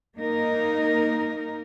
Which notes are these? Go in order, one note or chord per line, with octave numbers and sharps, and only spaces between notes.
A#3 D#4 A#4